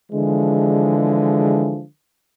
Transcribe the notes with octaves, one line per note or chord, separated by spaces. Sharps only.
D3 E3 F3 G#3